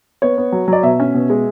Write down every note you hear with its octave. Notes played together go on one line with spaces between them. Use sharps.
B3 C#5
B3
F#3
F#3 D5
B2 E5
C#4
B2
G#3